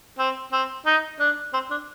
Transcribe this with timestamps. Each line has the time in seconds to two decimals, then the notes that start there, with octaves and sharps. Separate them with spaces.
0.19 C4
0.52 C4
0.86 D#4
1.20 D4
1.53 C4
1.71 D4